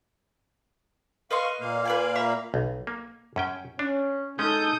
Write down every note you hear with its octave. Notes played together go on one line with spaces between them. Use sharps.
B4 D#5 F5 C6 C#6
A#2 A#3 F5
B4 D5 G#5
E5 A#5 B5
B1
A#3
F#2 C#4 G5
C#4 D4
G#3 C#4 D#4 G#4 A4 D#6 G6